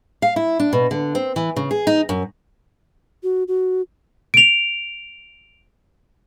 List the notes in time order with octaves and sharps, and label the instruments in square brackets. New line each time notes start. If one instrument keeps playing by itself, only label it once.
[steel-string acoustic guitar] F5
E4
D4
B2
D3
C4
E3
C#3
G#4
D#4
F#2
[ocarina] F#4
F#4
[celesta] D7 F7